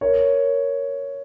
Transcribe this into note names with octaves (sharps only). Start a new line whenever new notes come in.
A#4 C#5